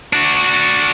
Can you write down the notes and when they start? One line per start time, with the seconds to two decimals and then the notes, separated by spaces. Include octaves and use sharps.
0.13 D4 F#4